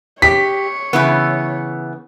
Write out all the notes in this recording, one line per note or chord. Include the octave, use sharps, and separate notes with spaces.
G4 C#5 B6
C#3 E3 B3